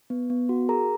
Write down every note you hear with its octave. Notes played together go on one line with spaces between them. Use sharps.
B3
B3
F#4
G#4 A#4 A#5